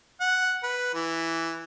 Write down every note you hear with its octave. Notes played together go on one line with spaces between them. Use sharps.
F#5
B4
E3